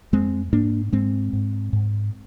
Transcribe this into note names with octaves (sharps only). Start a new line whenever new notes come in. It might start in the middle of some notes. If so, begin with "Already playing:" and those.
F2 G#3 C4
G#2 A#3 D4
G#2 G#3 C4
G#2
G#2